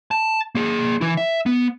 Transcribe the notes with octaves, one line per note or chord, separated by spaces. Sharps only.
A5
A#3 G#4
E3 E4
E5
B3